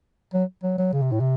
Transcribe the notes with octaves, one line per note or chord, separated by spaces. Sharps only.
F#3
F#3
F#3
C#3
C3
A2
C3